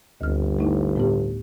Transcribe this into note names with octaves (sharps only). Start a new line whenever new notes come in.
G1 D2 F6
A3 D#4 E4
A2 B3 G4